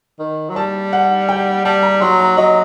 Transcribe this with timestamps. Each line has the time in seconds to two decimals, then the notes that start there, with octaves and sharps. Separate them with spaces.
0.19 D#3
0.50 F#3
0.56 G3 A5
0.93 F#5
1.29 G5
1.65 G3 A5
1.83 A#5
2.01 F#3 C6
2.20 A#5
2.37 F#3 D#5